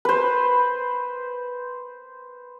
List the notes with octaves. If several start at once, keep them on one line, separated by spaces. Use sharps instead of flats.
B4 C5